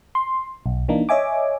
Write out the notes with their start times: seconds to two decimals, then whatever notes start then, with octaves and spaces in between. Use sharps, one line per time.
0.15 C6
0.66 B1
0.89 E3 A#3 D4 D#4
1.09 C#5 D#5 E5 G#5 D6